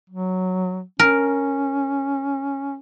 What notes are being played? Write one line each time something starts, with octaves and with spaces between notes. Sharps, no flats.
F#3
C#4 A#4